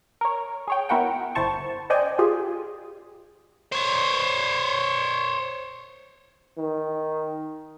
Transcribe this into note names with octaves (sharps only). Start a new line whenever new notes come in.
A#4 C#5
G#4 C#5 G5
B3 E4 F#4 A#4 F#5 G5
G1 E4 C5 A5 C#6
C#4 C5 D5 D#5 G5 G#5
F4 G4 G#4
C5 C#5
D#3